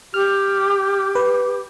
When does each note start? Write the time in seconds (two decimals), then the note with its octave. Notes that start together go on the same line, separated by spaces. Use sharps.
0.14 G4 F6
1.15 B4